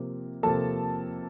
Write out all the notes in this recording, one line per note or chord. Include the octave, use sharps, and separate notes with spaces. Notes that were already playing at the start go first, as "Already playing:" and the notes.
Already playing: C3 F3 A#3
C3 F3 A#3 A4 A5